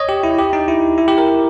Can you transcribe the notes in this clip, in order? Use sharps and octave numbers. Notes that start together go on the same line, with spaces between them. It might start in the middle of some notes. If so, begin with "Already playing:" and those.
Already playing: C#5 D#5
G4
E4
G4
D#4
E4
E4
G4
A#4